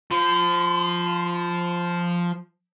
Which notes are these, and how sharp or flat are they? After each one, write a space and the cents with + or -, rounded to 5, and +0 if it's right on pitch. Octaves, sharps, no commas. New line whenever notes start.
F3 +0 C6 -45